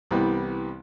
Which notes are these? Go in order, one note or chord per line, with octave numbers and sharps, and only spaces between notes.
C2 E3 G3 B3